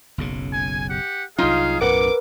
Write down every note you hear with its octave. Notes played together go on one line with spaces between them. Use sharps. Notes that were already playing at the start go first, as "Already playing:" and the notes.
F#1 B1 C#3
G#5
G4 F#5
C2 F#3 D#4 F4 G#4 F5
B1 F#2 A2 A#4 B4 F#5 D6